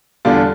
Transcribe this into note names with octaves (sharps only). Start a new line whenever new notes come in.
E2 D3 G3 D4 F4